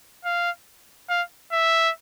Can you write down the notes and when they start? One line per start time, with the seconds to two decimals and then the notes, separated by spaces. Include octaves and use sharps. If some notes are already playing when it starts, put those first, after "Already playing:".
0.25 F5
1.10 F5
1.52 E5